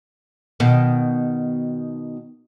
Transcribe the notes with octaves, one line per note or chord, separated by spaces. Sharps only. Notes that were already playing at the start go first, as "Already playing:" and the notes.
B2 D#3